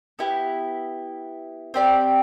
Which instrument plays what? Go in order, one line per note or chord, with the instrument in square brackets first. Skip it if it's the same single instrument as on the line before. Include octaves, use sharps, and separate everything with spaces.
[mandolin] B3 E4 G4
C4 G4 D5